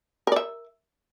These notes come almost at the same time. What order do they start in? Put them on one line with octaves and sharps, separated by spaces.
A#4 D5 E5